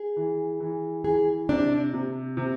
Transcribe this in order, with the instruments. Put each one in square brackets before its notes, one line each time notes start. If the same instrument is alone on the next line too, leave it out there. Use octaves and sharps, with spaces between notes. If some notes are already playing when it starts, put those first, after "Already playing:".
Already playing: [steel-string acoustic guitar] G#4
[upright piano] E3
E3
[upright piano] E3 [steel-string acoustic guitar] G#4
[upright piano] C3 [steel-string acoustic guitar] D4
[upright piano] C3
C3